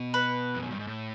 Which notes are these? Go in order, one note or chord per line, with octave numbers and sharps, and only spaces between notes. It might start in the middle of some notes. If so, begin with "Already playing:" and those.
Already playing: B2
B4
F2
F#2
G2
G#2
A2